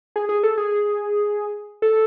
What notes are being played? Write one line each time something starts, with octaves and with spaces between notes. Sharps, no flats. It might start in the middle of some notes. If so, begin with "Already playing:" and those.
G#4
G#4
A4
G#4
A4